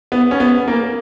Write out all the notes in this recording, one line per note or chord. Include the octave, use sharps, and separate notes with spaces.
B3
C#4
B3
A#3